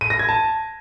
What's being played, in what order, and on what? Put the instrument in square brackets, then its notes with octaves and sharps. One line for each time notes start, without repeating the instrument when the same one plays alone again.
[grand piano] D#7
A#6
G#6
A5